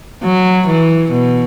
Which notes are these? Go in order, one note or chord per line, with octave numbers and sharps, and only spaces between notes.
F#3
E3
B2